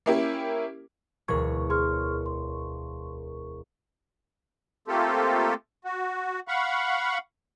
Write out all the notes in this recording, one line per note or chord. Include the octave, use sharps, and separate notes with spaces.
A#3 C#4 E4 G4 A#4
E1 D2 A#4 C#6 G#6
G#4 C#5 C6 F6
C6
A3 A#3 C4 F4 G4 A4
F#4
F5 F#5 B5 C#6